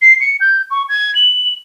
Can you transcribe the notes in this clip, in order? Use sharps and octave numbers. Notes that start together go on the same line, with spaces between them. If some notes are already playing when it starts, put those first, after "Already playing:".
C7
C#7
G6
C#6
G#6
F#7